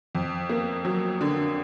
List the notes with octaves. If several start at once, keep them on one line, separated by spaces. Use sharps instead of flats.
F2
A#3
F#3
D3